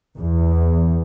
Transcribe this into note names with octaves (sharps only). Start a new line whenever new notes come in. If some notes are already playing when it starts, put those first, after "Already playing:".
E2